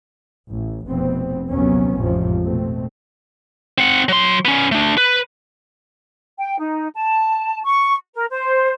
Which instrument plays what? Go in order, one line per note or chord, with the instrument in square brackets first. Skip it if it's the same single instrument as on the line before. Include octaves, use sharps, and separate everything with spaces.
[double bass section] A1
F1 F2 B2 B3 C4
A#1 D#2 C3 F#3 B3 C#4
A1 F2 G#2 C3 F3
B2 A3 C4
[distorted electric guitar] C4 F#5
F#3 C6
B3 C#4
A3 D4
B4
[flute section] G5
D#4
A5
C#6
A#4
C5